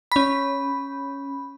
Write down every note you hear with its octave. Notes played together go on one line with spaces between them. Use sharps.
C#4 B5